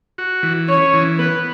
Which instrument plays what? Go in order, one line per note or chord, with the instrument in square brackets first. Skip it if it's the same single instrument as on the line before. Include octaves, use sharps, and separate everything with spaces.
[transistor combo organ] F#4
E3
[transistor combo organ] C#4 [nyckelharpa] C#5
[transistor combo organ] E3
[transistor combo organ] B3 [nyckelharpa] B4